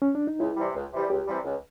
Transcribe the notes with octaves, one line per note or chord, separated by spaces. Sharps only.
C#4
D4
D#4
C#2 E4
C3 E3 G3
C#2
C3 E3 G3
C#2 G4
C3 E3 G3
C#2